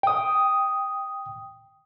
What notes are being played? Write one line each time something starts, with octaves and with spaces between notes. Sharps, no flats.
G5 D#6